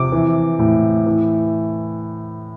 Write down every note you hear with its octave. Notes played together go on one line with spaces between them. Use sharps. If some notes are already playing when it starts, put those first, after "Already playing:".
Already playing: C3 F3 D6
E3
A2
E3